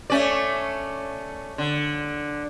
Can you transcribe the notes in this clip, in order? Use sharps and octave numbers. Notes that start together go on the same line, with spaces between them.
A3 C#4 D5
D3